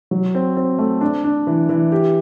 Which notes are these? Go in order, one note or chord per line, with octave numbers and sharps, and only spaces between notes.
F#3
C4
C4
A3
D4
D4
E3
E3
G4